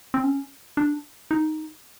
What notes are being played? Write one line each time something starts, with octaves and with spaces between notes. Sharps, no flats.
C4
C#4
D4
D#4